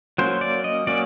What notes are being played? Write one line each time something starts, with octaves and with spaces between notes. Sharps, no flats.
F#3 A#3 C#4 C5
D5
D#5
F#3 A#3 C#4 D5